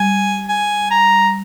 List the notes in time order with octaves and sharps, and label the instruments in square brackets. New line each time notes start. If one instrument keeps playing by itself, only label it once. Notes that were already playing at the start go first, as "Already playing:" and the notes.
Already playing: [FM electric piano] G3 [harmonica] G#5
[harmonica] G#5
A#5